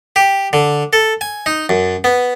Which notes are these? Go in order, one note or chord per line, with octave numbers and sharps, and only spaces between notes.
G4
D3
A4
G#5
D#4
F#2
B3